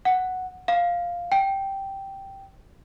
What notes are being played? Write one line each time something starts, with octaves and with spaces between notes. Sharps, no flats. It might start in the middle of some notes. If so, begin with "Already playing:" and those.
F#5
F5
G5